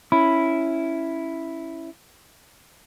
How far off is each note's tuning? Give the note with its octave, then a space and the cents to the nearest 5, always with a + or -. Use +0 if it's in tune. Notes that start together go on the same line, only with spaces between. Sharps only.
C#4 +0 E4 +0 B5 +0